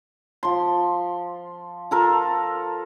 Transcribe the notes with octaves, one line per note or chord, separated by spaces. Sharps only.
F3 C6
F4 A4 A#4